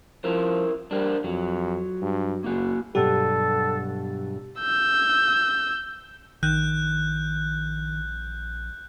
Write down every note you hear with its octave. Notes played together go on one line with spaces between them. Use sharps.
F3 E4 A#4 C5
G3 D4 A#4 C5
F2 F#3
G2
F#1 A#3 F#4
G2 B2 F#3 G4 A4
E6 G6
A#1 D#3 F#6 G6